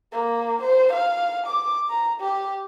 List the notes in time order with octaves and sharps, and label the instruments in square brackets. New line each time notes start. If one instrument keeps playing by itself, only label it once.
[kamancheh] A#3
C5
F5
D6
A#5
G4